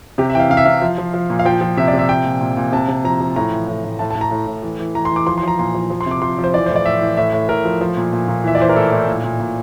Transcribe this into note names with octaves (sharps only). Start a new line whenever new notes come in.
C3 G4
E5
E3 G5
F5
C3 F5
E5
C3 F5
F3
F3
F3
A#2
F5
F3 G5
F3
C3 E5
D5
C3
E5
F3 G5
A#2
A#2
A#2
C3 A5
C3
F3 A#5
F3
A2 A#5
E3
A2
A2
A2 A5
A5
A2
A#5
A2
A2
E3
E3
E3 A#5
C6
E3
D6
F3 C6
C6
F3 A#5
A#2 C6
F3
F3
C6
C3 D6
F3 C6
F3
C5
E3 D5
A2 C5
D5
A2 E5
E3
A2 E5
A2
A2 A#4
F3
F3
A#2
A#2
A#2
E3 E5
D5
E3 C5
A#4
A2 A4
A2
A#2
A#2
A#2